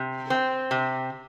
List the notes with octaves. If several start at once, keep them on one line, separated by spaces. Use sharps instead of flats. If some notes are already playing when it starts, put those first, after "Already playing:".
Already playing: C3
C4
C3